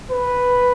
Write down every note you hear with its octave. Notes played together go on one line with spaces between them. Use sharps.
B4